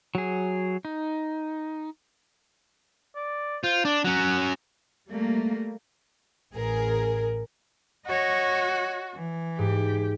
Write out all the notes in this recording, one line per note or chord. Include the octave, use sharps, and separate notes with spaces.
F#3 G#4
D#4
D5
F4 C5
D4 D5
F#3 C#4 F#5
G3 A3 A#3
A1 G#4 A#4
F#4 C#5 D#5
E3
G#2 G4